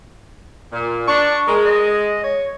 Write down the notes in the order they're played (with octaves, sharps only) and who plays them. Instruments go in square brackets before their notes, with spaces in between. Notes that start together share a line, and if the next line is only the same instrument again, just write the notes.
[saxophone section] A#2
[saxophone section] D4 [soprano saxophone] C#6
[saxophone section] G#3 [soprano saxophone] A#4
[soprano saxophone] D#5
C#5